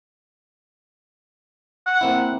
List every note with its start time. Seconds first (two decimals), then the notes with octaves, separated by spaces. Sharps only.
1.86 F#5
2.01 A#3 C4 E4